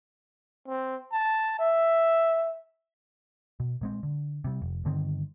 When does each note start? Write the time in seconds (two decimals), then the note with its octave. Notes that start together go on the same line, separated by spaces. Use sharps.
0.68 C4
1.12 A5
1.59 E5
3.60 B2
3.81 A#2 G#3 C4
4.03 D3
4.44 C3 G3
4.62 F1
4.85 G2 D3 D#3 C4